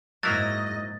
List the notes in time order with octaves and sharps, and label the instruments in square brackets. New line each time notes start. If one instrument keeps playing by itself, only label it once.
[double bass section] G#2 [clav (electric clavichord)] F#3 A#3 E4 [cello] D#5 [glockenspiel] A6